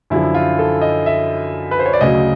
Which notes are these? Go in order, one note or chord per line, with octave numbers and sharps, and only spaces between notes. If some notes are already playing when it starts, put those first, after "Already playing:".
F#2 D3 F3 E4
F4
A4
D#5
E5
B4
C5
C#5
D5
D2 C#3 F#3 D#5